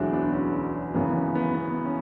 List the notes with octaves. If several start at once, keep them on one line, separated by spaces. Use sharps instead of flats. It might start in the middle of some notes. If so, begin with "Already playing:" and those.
Already playing: E1 D2 D3 F#3 D4 E4 F#4 G#4
B3 D4
C#4
G#1 F#2 C#3 E3 B3
C#4
B3
B3
C#4